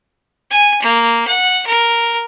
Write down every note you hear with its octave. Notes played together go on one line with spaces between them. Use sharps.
G#5
A#3
F#5
A#4